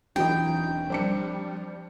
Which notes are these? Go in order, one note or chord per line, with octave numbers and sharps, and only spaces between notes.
E1 E3 F#3 C4 D4 D#4 G5
F3 G3 C4 D4 C#7